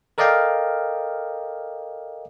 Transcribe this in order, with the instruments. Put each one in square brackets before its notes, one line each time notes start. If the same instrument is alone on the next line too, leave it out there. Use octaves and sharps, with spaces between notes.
[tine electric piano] A4 A#4 D5 D#5 F5 G5